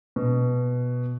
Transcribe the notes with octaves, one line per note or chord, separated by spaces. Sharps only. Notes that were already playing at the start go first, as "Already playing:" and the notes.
B2